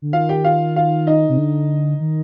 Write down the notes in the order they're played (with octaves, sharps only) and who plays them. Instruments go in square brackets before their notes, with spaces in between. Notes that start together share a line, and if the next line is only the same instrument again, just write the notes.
[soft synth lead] D3
[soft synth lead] D#3 [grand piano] F4 F5
[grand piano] G4 G5
F4 F5
F4 F5
D#4 D#5
[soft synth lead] C3
D3
D#3